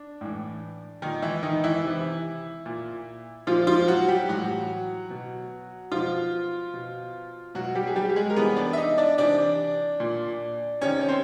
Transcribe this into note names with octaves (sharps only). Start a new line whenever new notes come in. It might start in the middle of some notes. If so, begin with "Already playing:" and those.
Already playing: D4
A2 E3
A#2 D#3 D#4
E3 E4
D#3 D#4
E3 E4
C3 E3
A#2
A#2 F3 F4
F3 F4
F#3 F#4
G3 G4
A2 E3 F#3 F#4
B2
B2 F3 F4
B2
B2 F#3 F#4
G3 G4
G#4
G3 G4
G4
G#3 G#4
A#4
C3 E3 B3 B4
D4 D5
E5
D#4 D#5
D4 D5
C3 E3 D4 D5
A#2
C3 D#3 C#4 C#5
C#5
C4 C5